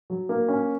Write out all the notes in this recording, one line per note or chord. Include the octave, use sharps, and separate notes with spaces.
F#3
A#3
C#4